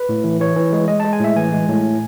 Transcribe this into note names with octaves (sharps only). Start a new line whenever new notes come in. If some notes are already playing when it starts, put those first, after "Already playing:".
Already playing: B4
A2
E3
E3 C#5
E3
G#3
G#3 D#5
G#3 A5
G#5
A2 E5
E3 G#5
G#3
A2